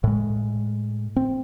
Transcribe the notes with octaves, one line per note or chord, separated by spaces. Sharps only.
A2 G#3
C4